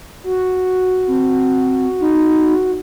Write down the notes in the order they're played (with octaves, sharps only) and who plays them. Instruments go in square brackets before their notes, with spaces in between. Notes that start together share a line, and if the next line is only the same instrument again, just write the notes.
[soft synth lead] F#4
[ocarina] C4
D#4